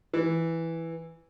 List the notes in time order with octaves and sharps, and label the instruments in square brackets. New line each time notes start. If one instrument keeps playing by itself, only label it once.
[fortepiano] E3